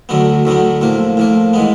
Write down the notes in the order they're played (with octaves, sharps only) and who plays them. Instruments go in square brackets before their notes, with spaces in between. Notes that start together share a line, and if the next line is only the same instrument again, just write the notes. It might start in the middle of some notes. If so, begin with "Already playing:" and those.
[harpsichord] D2 D3 F#3 B3
D2 D3 F#3 B3
A2 F3 A#3
A2 F3 A#3
E3 G#3 B3